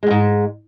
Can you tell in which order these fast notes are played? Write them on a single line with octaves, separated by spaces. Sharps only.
G#3 E2 G#2